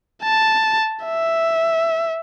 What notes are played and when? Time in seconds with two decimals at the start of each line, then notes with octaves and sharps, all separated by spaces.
0.23 A5
1.06 E5